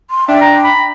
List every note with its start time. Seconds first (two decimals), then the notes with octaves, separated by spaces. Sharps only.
0.10 C6
0.28 D4 E5 G5
0.41 A#5
0.65 B5